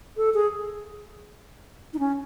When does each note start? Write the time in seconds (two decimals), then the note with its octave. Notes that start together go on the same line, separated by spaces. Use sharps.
0.17 A4
0.34 G#4
1.94 D#4
1.99 C#4